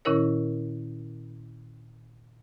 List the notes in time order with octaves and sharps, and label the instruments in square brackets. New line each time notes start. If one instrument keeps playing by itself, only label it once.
[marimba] A#2 D#3 C#4 E4 A#4 C#5